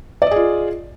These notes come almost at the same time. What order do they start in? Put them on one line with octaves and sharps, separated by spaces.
D5 D#5 G#4 F4